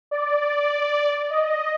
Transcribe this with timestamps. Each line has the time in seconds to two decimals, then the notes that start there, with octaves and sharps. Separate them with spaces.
0.11 D5
1.30 D#5